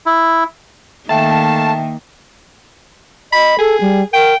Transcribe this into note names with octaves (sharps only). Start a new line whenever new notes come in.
E4
D#3 A3 A#3 E5 F5 G5 A5
D#5 B5
G#4 A4
G3
A#4 G5